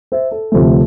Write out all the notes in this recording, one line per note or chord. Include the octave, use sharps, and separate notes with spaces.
C5 E5
A4
D2 C3 F3 A3